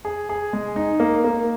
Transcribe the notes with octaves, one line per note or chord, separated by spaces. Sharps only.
G#4
G#4
G#3
D#4
A#3
A#3